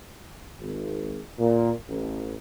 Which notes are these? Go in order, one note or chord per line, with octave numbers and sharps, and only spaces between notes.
G#1
A#2
A1